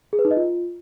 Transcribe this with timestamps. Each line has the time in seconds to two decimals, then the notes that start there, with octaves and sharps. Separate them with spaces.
0.13 G#4
0.19 B4
0.25 D#4
0.31 D#5
0.37 F4